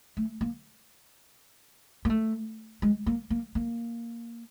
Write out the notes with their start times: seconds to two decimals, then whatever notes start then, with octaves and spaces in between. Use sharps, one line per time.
0.17 A3
0.41 A#3
2.05 A#3
2.10 A3
2.82 G#3
3.06 A#3
3.30 A#3
3.55 A#3